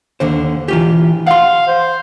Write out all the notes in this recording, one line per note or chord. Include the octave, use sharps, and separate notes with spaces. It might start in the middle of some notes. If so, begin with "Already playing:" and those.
D#2 D3 C5
E3 F4 G4
F5 F#5 C6
C5